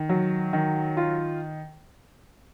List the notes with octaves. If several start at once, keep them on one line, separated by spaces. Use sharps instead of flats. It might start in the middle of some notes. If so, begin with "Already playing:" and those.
Already playing: D#3
F#3
D#3
F4